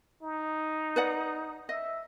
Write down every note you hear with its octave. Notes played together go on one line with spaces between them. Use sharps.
D#4
B4 D5 F#5
D#5 E5